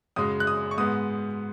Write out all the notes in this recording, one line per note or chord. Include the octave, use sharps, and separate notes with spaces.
F#2 C#3 G#3 D#6
F#6
D#6
C#6
G#2 G#3 B3 D#6